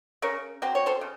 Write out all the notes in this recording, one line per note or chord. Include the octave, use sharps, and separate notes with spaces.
C#3 A#4 C#5
F#3 C4 C5
C#5
A4 C5
C#3